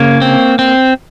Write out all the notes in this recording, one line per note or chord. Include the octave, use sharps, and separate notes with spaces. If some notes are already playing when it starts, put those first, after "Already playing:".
Already playing: C#3 A#3 C#5
C4
C4